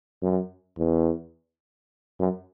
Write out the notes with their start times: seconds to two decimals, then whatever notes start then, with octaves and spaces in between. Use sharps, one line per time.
0.22 F#2
0.78 E2
2.19 F#2